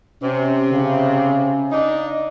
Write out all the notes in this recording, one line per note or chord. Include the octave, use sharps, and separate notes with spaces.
C3 C#4
C#3
D4 D#4